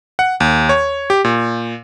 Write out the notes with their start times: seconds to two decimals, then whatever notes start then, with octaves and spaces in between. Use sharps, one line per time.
0.19 F#5
0.40 D#2
0.69 C#5
1.10 G4
1.25 A#2